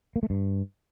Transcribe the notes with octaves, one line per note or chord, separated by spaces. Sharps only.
A#3
A3
G2